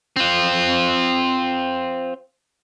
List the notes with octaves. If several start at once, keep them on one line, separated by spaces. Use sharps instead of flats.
C4 F4